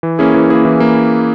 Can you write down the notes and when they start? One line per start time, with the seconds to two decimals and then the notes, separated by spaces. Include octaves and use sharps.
0.03 E3
0.19 A#3 C#4 E4 G#4
0.34 E3
0.50 A#3 C#4 E4 G#4
0.65 E3
0.80 A#3